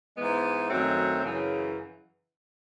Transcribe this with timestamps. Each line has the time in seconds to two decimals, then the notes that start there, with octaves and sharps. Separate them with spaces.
0.16 G#2 E3 G#3 B3
0.69 F#2 D#3 F#3 A3 C4
1.23 F#2 C#3 E3